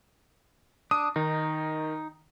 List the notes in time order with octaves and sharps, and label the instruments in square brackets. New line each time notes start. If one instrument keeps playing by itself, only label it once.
[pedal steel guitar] D4 [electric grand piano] D#6
[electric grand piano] D#3 [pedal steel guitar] D#4